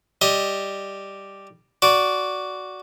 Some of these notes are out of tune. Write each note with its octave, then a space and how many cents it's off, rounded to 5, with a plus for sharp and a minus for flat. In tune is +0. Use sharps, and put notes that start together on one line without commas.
G3 +0 D#5 +10
F#4 +0 D5 -10